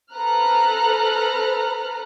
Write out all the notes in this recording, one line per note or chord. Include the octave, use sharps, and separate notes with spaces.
A4 B4 C5 A#5 F6 F#6